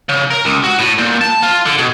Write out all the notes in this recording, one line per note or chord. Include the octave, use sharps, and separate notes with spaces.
C#3
A#4
C#2
F#4
A2
A#2
A5
F4
D3
B2